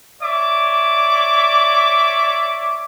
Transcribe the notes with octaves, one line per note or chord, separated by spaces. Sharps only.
C#5 D5 E5 D6